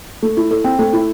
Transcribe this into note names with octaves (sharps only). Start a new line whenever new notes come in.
A3
E4
A4
C4
A3
E4